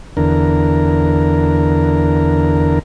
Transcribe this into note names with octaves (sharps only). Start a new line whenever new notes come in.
E2 D3 A#4